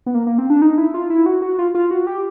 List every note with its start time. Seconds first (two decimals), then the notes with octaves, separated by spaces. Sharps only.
0.06 B3
0.14 A#3
0.27 A#3
0.38 C4
0.50 D4
0.62 D#4
0.78 E4
0.94 F4
1.10 E4
1.26 F#4
1.42 F#4
1.59 F4
1.75 F4
1.91 F#4
2.07 G4